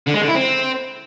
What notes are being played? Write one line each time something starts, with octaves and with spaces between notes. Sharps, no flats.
D3
G#3
D3
E4
C4